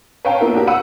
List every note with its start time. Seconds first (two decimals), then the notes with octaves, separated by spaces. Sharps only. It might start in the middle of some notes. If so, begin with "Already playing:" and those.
0.25 B4 C#5 F5 G5 A5 A#5
0.40 A#3 B3 E4 F4 A#4
0.54 D4 F#4 G4 A#4
0.67 F#5 B5 E6 D#7